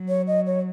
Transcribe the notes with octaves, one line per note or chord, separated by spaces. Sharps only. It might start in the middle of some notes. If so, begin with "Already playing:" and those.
Already playing: F#3
C#5
D#5
C#5